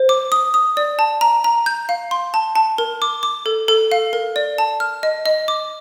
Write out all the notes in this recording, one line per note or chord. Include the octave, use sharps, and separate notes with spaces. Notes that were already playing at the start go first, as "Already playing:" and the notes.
Already playing: C5
D6
D#6
D#6
D5
A5
A#5
A#5
G6
F5
C6
A5
A5
A#4
D6
D6
A4
A4
F5
A#4
D5
A5
F6
D#5
D#5
D6